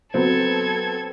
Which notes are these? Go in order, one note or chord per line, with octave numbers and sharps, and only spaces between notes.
F#3 B3 C4 A4 G#6